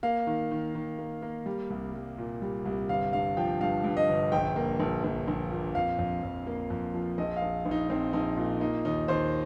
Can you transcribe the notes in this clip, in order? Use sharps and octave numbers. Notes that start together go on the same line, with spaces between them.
A#3 F5
D#3
D#3
D#3
A#3
A#3
G3
C2
G3
A#2
G3
C2
G1 F5
G2 F5
F3 G5
G2 F5
G2
D#5
G1
A#1 G5
A#3
A#1
A#1
A#1
A#2
F2 F5
F2
F2
A#3
F2
F3
A#1 D#5
F5
A#1
A#1
D#4
A#1 C4
A#1 D#4
A#2
A#3 D#4
D#2 D#4
D#2 C5